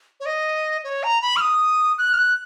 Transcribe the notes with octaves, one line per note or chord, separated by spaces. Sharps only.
C#5
D#5
C#5
A#5
B5
F6
D#6
F#6
F6
F#6